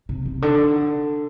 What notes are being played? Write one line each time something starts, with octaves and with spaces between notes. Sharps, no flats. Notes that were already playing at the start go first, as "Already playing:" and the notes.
C3
C3
D3